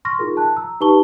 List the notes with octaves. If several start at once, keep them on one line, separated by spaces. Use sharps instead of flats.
C6 C#6 F6 A#6
D#4 F4 G#4 A#4
A5 F#6
A#5 E6
D#4 G4 B4 A5 C#6 G7